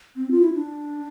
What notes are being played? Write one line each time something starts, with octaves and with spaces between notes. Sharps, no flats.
C4
F4
E4
D4